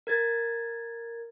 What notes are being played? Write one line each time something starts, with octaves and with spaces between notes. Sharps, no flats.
A#4 G#6 A6